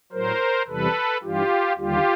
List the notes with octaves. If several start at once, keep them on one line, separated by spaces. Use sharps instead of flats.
A2 F#3 A#4 C5
E2 C3 E3 G3 A4 B4
G2 E3 G3 F4 G4
D#2 D3 G3 F4 G4